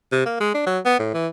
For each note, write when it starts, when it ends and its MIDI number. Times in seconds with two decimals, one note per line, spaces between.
0.12 0.24 48
0.26 0.40 58
0.41 0.50 56
0.54 0.65 62
0.66 0.79 54
0.85 0.98 59
0.99 1.11 45
1.14 1.27 52